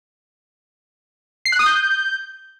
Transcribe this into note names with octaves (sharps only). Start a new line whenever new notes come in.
C7
F#6
D#6
G6